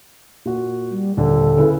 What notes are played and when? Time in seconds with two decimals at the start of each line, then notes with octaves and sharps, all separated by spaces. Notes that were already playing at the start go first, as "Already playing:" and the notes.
0.46 A#2 F#4
0.91 G3
1.17 D#1 D3 A4
1.57 C#3 E4 B4